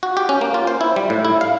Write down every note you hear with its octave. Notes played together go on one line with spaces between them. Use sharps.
F#4
G4
C#4
A#3
F4
C5
E4
G3
A2
E4
F5